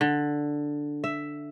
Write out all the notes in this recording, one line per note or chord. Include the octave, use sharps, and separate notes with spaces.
D3
E5